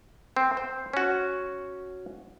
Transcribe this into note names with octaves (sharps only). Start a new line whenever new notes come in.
C4
C5
C#4 F#4